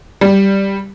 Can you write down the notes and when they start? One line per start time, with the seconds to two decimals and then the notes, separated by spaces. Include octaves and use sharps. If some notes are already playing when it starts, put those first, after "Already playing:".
0.21 G3